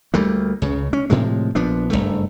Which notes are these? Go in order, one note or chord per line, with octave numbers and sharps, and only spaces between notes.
D2 G3 A3 A#3
C#2 C#3
C#4
A2 C3 F3 G#3
A#1 F3 B3 D4
F#1 C#2 G2 A3